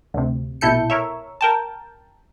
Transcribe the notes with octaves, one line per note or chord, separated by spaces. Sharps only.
D2 C3
A#1 B2 E4 A4 G6 C#7
A#4 C#5 E5
A#4 G5 A5